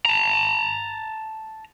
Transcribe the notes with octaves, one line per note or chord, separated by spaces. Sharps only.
A5 A#5